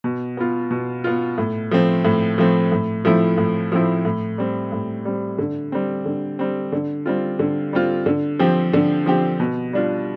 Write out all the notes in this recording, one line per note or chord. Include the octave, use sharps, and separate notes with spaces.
B2
B3 F4
B2
B3 F4
A2
F3 A3 C4
A2
F3 A3 C4
A2
F3 A3 C4 E4
A2
F3 A3 C4 E4
A2
G3 C4
A2
G3 C4
D3
G3 C4
D3
G3 C4
D3
G3 C4 F4
D3
G3 C4 F4
D3
F3 C4 G4
D3
F3 C4 G4
B2
G3 D4 F4